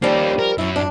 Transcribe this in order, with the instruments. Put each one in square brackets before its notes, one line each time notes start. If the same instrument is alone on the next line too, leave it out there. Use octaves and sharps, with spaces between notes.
[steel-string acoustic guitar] F3 G3 C#4 [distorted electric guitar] A#3 D#4
[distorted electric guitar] A#4
[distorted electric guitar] F#2 [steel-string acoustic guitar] C#4 E4
[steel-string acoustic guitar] D4